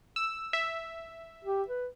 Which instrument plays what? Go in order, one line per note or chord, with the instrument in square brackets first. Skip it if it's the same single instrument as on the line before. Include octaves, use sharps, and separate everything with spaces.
[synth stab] E6
E5
[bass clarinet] G4
B4